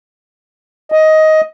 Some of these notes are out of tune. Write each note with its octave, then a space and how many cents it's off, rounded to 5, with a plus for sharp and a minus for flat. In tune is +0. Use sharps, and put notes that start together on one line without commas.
D#5 +10